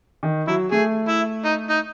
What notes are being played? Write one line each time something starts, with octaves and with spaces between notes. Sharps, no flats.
D#3
F#3 E4
A3 G#4
E4
D#4
D#4